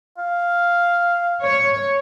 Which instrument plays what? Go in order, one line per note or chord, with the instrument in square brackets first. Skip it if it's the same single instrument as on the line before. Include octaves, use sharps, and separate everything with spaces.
[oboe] F5
[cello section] C#5